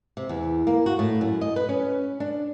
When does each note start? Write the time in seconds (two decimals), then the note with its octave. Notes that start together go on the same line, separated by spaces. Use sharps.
0.17 C3
0.29 E2
0.67 A#3
0.86 F#4
0.99 A2
1.21 F#2
1.41 D#5
1.56 B4
1.69 C#4
2.20 D4